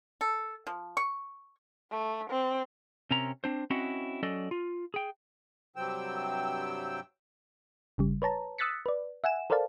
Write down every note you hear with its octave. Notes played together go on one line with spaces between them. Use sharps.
A4
F3
C#6
A3
C4
C3 C4 C#4 A#4 A#5
C4 D4 C5
C4 C#4 E4 F#4 D#5 F#5
F#3 C#4 A4 D5 D#5
F4
G#4 G5
G2 C3 F#3 C4 G5 E6
G1 C#3 G3
B4 C#5 A5 A#5
D#6 E6 F#6 A6 B6 C#7
B4 D5
E5 F#5 G#5 E7
A4 A#4 C5 D5 F5 A5